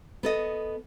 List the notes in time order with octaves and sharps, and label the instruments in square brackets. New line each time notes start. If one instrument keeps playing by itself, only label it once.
[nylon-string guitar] B3 A4 D#5